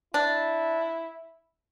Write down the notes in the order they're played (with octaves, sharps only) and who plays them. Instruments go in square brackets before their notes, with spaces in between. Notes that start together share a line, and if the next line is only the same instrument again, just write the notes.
[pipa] D4 [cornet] E4